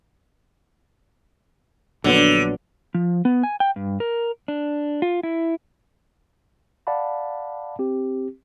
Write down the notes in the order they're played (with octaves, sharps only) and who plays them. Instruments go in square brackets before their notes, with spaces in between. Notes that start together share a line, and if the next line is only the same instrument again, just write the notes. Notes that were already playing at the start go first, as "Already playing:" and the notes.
[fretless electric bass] A#1 F#3 B3 [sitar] D3
[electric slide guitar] F3
B3
G#5
G5
G2
A#4
D4
F4
E4
[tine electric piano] D5 F5 F#5 A5 B5
C4 G4